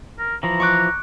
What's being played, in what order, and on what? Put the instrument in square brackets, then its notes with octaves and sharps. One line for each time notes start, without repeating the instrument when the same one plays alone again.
[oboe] A#4
[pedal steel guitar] E3 F3 [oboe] A#5
[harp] C#6 D6 F#6